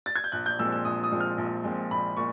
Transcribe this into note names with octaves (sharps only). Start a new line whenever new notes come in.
A6
G#6
G6
A#1 F#6
G6
A#2 F3 G#3 C4 E6
E6
A#1 D#6
D#6
A#2 F3 G#3 C4
F6
A#1
A#2 F3 G#3 C4
A#1 B5
A#2 C#6